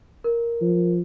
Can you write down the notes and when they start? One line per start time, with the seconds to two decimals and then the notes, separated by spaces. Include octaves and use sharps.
0.24 A#4
0.61 F3